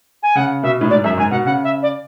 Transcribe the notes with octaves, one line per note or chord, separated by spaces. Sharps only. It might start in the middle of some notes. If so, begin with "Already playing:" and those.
G#5
C#3 F#5
B2 E5
A2
G#2 D5
F#2 E5
G#2 G#5
B2 F#5
C#3 F#5
E5
D5